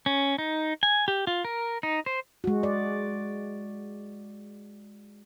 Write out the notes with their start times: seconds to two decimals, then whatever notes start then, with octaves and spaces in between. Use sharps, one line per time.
0.06 C#4
0.38 D#4
0.83 G#5
1.08 G4
1.27 F4
1.45 A#4
1.83 D#4
2.06 C5
2.44 G#3 F#4
2.63 D5